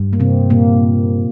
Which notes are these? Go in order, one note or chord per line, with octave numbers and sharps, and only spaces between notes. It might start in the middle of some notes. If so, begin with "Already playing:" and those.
Already playing: G2
A#3
C3 C4
A#2 A#3